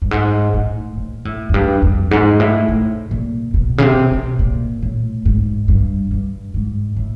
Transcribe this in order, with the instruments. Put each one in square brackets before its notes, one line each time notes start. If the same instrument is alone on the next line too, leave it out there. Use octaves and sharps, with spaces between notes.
[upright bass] G2
G#2
A2
A#2
A2
F#2
G2
F2
G#2
A2
A2
A#2
B2
C#3
C3
B2
A#2
A2
G#2
G2
G2
G#2
A2